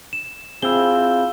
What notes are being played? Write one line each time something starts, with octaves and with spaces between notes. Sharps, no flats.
E7
C4 E4 F4 G#4 E6 G7